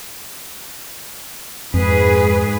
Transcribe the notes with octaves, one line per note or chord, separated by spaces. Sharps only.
F2 G#2 G#4 B4